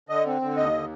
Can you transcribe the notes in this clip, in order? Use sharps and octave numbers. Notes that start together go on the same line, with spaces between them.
D3 D#5
C4
D3
D#2 D#5
D3